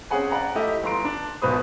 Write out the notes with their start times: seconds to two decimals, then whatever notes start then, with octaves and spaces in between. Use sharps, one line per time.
0.11 C4 C#4 G#4 F#5 G#5
0.30 D5 F#5 A#5
0.55 A3 E4 G4 D#5
0.83 G1 A#5 C6 D7
1.05 D4
1.42 E1 B1 B2 B4 C5 D#6